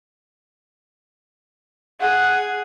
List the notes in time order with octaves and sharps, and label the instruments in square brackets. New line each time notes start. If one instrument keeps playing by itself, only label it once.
[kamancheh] G#4 [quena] F#5